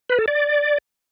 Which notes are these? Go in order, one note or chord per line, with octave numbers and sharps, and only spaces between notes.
B4
A4
D5